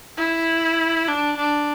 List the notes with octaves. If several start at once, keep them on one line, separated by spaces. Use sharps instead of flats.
E4
D4
D4